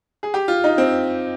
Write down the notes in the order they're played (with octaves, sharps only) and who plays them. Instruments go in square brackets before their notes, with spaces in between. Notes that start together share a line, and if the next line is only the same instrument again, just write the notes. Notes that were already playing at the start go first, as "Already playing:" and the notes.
[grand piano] G#4
G4
F4
D#4
C4